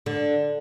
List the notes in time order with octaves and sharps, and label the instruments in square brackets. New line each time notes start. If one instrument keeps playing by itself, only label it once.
[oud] D3